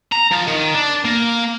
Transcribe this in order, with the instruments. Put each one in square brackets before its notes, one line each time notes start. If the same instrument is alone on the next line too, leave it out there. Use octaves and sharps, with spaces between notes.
[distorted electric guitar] A#5
F3
D#3
D4
A#3